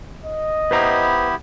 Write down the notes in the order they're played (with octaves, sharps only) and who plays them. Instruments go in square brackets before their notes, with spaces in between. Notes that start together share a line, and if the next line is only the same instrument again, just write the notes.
[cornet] D#5
[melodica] B3 E4 G4 [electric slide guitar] B4 C5 A#5